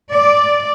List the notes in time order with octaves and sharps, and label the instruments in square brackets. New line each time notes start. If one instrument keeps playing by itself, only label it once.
[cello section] D5